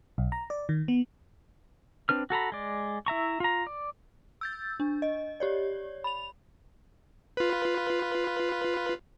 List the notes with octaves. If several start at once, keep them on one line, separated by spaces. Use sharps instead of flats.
B1
A#5
D5
D#3
B3
C4 D4 B4 F6
F#4 A4 A#5 B5
G#3 D5
E4 E5 A#5 C#6
F4 A#5
D5
E6 G6 A6
D4
D#5
G4 C#5 D5
B5 F7
F4 B4